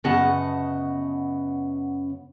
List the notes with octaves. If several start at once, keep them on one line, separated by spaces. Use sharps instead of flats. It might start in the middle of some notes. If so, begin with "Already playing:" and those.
F#2 C#3 B3 D#5 F#5 A5